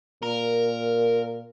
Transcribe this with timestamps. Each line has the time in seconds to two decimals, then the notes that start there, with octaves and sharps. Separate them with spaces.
0.23 A#2 A#4